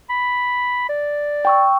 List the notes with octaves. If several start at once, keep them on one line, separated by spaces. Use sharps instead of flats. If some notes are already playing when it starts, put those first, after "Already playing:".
B5
D5
G5 C#6 E6